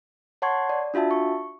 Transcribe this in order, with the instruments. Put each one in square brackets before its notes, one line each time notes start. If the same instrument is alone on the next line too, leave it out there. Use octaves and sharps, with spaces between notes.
[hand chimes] C#5 F#5 A5 C6 C#6 G#6
D5
D4 F4 F#4 E5 A5
C#6